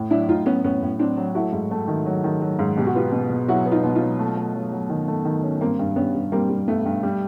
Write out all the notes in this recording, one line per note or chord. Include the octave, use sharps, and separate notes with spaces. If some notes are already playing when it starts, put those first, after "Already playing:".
Already playing: A2
F#3 D4 E4
A2 D#4 F4
F#3 B3 C#4
A2 B3 C#4
A2
F#3 C4 D4
F#3
A3 E4 F#4
G#2
A3
D#3
F#3
D#3
F#3
G#2
B2 G4
F#4
B3 F4 G4
B2
B2
F#3 E4 F#4
B3
D#4 F4
B2
D#4 F4
F#3
A3
A3
F#3
F#3
D#3
A3
D#3
C#4
G2 A#3 C4
G2
G2 B3 C#4
G2
G3 A#3 C4
G3
G2 A3 B3
G2
G3